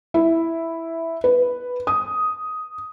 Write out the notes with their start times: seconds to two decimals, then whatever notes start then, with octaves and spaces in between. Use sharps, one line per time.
0.14 E4
1.24 B4
1.87 D#6